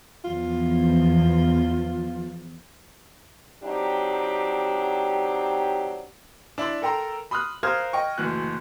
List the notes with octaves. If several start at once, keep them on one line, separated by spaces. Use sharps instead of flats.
E2 F3 F4
F#3 C4 D4 D#4 G4
D4 E4 D5 C6
A4 A#4 G5 A#5 C6
B5 C6 D#6 F6 F#6
A#4 C5 F5 D#6 F6 G#6
D#5 G5 C#6
F#1 D2 E3 F#6